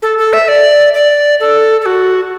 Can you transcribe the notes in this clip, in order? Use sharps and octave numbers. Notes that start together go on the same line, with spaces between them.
A4
A4
E5
D5
D5
A4
A4
F#4